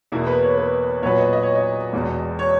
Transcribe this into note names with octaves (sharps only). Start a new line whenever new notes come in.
E2 B2 A#3 E4
B4
C#5
B4
A#2 F#3 B3 F#4 B4 C#5
D#5
D#5
C#5
D#5
E1 E2 B2
C#5